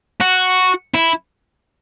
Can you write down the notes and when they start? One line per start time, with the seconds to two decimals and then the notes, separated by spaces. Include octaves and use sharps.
0.21 F#4
0.95 E4